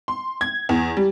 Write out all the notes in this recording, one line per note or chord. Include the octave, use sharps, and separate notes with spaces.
C6
G#6
E2
G3